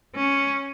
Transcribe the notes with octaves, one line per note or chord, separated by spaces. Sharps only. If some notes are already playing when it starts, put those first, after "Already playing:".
C#4